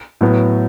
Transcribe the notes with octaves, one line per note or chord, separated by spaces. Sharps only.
A2 F#3 B3